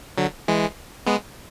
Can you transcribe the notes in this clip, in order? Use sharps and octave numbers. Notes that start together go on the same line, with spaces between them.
D3 F#3
E3 G#3
G#3 B3